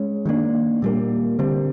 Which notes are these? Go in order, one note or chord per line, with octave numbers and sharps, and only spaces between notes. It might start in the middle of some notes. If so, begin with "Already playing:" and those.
Already playing: G#3 C#4
D#3 G3 A#3 D4
A#2 G3 A#3
D3 G3 C4